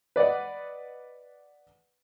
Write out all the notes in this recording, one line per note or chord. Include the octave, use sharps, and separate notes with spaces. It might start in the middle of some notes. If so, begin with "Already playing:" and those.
B4 D5 D#5 F#5